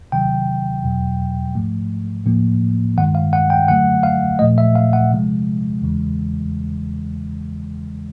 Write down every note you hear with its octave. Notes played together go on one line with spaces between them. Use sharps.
C3 D#3 F#3 G5
E2 B2 F#3
G#2 F3 A3
A2 F3 A#3
G2 D#3 G#3 F#5
F5
F#5
G5
F#2 D3 F#3 A3 F#5
F5
A#2 F3 A3 D#5
E5
F5
F#5
C3 F3 G#3
E2 C#3 E3 G#3